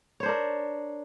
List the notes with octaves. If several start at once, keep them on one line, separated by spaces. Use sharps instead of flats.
D4 A#4 C5 C#5